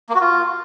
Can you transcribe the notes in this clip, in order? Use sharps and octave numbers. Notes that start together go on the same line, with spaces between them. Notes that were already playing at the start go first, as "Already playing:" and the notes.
A#3
F#4
F4